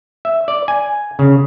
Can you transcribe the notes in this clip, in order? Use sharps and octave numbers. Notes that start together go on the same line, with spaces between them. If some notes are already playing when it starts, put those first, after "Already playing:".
E5
D5
G#5
C#3